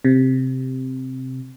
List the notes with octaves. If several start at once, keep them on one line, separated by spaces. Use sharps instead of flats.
C3